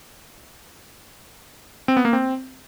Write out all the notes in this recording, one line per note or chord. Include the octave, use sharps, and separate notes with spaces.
C4
B3
A#3
C4